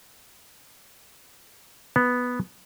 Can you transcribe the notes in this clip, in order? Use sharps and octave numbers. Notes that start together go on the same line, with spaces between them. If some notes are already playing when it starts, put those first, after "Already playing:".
B3